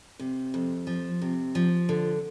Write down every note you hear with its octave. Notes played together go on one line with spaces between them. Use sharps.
C3
F2
F3
C3
F3
D3